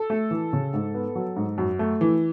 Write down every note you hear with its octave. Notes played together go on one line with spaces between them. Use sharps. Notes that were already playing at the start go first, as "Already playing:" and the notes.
Already playing: A4
A3
E3
C#3
G#2
B3
F#3
G#2
F#2
A3
E3